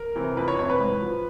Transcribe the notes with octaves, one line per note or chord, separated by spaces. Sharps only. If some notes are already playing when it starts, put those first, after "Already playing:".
Already playing: A#4
C3 E3
F2 B4
C#5
C3 E3 C#5
B4
G#2
F3